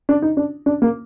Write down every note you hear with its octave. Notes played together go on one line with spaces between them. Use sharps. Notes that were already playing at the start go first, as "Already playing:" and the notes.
D4
D#4
D4
D4
A#3